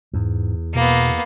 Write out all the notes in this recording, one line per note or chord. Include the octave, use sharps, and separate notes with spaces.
E2 G#2
B2 A#3 B3